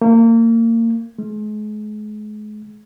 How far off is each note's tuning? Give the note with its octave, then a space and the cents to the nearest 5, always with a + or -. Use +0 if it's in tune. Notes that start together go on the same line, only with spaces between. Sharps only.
A#3 -30
G#3 +35